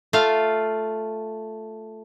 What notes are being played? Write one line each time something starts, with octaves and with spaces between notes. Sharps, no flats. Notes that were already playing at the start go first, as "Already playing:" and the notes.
A3 F4 F5